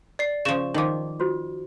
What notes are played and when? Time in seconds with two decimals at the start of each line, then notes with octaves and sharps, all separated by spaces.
0.19 D5 C7
0.45 C#3 F3 C#6 E7
0.74 D#3 F3 D#4 D#5 D6
1.20 F4 F#4 C5